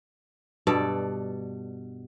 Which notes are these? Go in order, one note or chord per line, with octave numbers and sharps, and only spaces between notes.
G2 B2 A4 D5